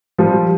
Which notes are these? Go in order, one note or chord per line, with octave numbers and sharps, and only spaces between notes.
F3 G3